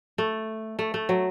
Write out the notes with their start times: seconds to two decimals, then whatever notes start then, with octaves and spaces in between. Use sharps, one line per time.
0.18 A3
0.79 A3
0.94 A3
1.09 F#3